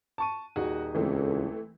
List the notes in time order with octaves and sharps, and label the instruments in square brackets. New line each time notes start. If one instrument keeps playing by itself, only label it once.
[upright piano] A5 C#6 D#7
[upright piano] D#1 D#4 G#4 [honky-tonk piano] F#4
[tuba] C#2 [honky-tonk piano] E3 A3 C4